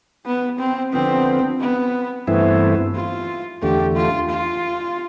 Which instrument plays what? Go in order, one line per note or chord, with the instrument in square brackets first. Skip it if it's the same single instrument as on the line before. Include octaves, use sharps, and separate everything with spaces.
[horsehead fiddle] B3
C4
[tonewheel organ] D3 F3 B3 [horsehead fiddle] C4
[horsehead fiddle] B3
[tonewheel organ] G2 E3 A3 C4 E4 [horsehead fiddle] B3
[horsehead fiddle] F4
[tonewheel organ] E2 D3 A3 [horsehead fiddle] G4
[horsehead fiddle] F4
F4